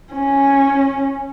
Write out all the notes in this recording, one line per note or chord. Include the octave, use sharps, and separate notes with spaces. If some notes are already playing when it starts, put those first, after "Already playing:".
C#4